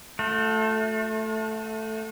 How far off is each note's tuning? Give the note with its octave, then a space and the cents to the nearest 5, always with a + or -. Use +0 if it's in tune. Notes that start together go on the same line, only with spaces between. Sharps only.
A3 +0 F#4 -45